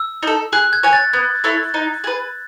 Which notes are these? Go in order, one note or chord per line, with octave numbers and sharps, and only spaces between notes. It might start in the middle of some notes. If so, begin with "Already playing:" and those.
Already playing: E6
D#4 A4
G#4 F#6
G#6
C#5 G#5
A6
B3 G#6
E4 A4 C#5
D#4
G#4 B4